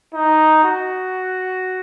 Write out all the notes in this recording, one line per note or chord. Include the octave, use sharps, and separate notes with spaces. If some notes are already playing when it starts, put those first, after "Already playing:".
D#4
F#4